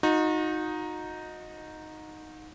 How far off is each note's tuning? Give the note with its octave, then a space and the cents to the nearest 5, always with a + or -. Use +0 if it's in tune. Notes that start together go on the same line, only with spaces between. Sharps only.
D#4 +0 F#4 -40